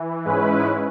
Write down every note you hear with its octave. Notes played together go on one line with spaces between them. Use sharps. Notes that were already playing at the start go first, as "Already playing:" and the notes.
Already playing: E3
G#2 G#3 C#4 E4 B4